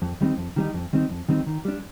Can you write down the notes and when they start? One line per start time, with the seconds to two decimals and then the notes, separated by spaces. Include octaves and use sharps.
0.02 F2
0.21 D#3 G3 C4 D#4
0.38 F2
0.56 D#3 G3 C4 D#4
0.74 F2
0.93 D#3 G3 C4 D#4
1.11 F2
1.29 D#3 G3 C4 D#4
1.47 D#3
1.65 G3 D4